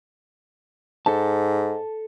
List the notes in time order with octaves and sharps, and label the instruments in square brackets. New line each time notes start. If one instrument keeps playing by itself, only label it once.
[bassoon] G#2 [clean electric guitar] A4 A5